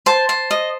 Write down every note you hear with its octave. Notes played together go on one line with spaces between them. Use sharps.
C5 A5
C5
D#5